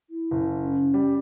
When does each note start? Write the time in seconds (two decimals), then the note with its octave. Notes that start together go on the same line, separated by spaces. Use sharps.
0.10 E4
0.31 F#1
0.58 C#4
0.94 G3